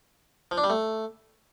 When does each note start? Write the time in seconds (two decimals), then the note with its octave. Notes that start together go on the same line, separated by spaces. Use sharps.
0.51 F3
0.58 D4
0.64 G3
0.70 A3